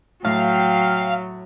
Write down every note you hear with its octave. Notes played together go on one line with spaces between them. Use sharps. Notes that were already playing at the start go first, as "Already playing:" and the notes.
A2 F#3 F5 G5